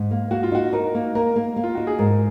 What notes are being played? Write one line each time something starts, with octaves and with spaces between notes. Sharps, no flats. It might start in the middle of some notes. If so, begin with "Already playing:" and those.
Already playing: G#2
A#3
A#3 F#4
F4
D#4 F#4
D#4 A#4
A#3
A#3 A#4
A#3
A#3
F4
D#4 F#4
G#4
G#2 A#4